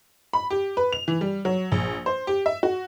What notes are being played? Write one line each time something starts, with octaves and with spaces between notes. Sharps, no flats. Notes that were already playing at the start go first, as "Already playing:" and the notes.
B5
G4
B4
F7
E3
G3
F#3
A#1
C5
G4
E5
F#4